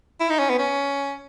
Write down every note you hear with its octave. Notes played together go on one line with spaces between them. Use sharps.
E4
D#4
C#4
B3
C#4